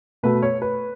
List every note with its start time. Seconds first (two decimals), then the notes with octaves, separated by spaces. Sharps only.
0.23 B2 A3 B4
0.43 C#5
0.62 B4